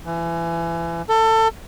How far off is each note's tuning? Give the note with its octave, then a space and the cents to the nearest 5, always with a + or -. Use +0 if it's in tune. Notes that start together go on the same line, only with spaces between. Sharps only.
E3 +30
A4 +25